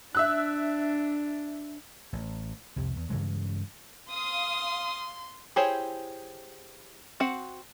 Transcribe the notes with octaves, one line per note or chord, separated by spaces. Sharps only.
D4 E5 E6 F#6
A1
C2 F2 C3
E2
G2 C#3 E3 G#3
F5 C6 D#6
E4 G4 G#4 C5 C#5
C4 F#4 F#5